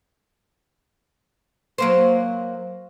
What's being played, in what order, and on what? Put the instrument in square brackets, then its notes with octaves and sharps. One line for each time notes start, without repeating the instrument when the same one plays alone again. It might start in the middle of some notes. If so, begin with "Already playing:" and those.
[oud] F#3 A#3 C5